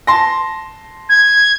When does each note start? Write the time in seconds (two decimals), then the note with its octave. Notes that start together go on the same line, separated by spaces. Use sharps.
0.07 A5 C6 A#6
1.09 G#6